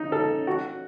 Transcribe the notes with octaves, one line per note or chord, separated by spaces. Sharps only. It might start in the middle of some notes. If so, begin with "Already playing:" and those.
Already playing: D#4
A4
F#4